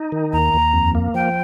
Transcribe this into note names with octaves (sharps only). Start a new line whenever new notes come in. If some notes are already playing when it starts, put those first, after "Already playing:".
Already playing: D#4
D#3
D#2 A#5
D#2
F2
A#3
F3 G5